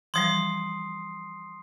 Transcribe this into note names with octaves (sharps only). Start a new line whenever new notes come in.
E3 F3 G3 C6 D#6 C7